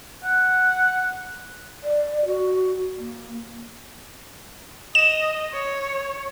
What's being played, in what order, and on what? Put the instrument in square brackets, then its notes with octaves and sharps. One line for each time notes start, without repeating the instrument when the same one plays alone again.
[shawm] F#5
[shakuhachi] D5
F#4
A#3
[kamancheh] D#5 [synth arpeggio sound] E7
[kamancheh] C#5